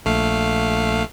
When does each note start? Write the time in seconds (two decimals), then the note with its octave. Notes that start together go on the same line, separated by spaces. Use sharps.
0.05 A#1 A3 F5